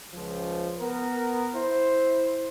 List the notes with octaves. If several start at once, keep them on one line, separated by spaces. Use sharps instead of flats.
C#2 F3
B3 A#4
E4 C5